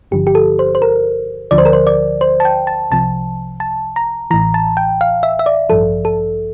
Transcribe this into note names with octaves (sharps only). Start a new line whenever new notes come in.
G1 G2 D3 F3 G4
G4
A4
C5
C5
A#4
D2 D3 F3 D5
C5
A#4
C5
D5
C5
A5
G5
A5
C2 C3 F3 A5
A5
A#5
A1 A2 E3 A#5
A5
G5
F5
E5
E5
D5
A1 G2 F3 A4
A4